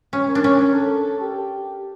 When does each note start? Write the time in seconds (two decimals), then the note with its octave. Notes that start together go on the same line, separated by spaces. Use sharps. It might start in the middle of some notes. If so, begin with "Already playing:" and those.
0.13 C#4
0.29 A#4
0.35 D4
0.44 C#4
0.75 A4
1.20 G4